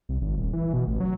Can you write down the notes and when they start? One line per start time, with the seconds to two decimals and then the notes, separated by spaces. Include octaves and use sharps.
0.09 C2
0.21 G#1
0.37 D#1
0.53 E3
0.73 B2
0.87 A1
1.00 F#3